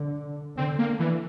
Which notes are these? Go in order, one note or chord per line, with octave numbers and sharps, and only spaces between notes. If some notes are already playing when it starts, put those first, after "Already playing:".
Already playing: D3
D3 C4
A#3
E3